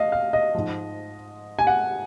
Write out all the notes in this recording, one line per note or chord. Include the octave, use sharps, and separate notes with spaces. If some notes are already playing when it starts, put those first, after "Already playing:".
Already playing: D#5 F5
F5
D#5
G#2 F3
G#5
F#5